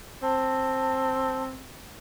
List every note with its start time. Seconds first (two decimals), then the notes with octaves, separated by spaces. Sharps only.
0.23 C4 A5